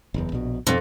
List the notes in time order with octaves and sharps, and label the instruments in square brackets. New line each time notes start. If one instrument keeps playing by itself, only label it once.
[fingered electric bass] F#1 E2
A#1 B2
[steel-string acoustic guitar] F2 [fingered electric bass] B2 G#3 C4